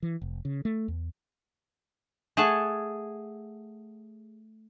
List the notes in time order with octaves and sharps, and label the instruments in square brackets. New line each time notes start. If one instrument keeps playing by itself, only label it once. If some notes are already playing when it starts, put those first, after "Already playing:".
[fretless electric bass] E3
F1
C#3
A3
E2
[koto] A3 G#4 C#5 F#5 A5